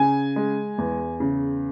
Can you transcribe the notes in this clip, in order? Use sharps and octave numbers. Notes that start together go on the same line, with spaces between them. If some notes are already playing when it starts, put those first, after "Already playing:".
Already playing: C#3 G#5
G#3
E2
C#3